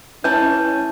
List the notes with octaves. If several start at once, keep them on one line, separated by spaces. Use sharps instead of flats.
E3 A3 C#4 E4 B4 G6